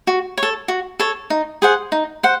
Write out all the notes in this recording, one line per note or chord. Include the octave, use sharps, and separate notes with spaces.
F#4
C#5
A4
F#4
A4 C#5
D#4
G#4 C5 F#5
D#4
C5 F#5